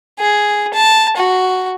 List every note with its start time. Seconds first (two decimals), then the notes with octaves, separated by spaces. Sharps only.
0.19 G#4
0.74 A5
1.17 F#4